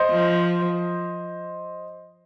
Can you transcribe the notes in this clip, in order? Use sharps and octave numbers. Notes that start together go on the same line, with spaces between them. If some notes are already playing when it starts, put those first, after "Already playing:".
Already playing: C5 D#5
F3